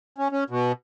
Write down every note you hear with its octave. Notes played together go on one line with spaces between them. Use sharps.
C#4
C#4
B2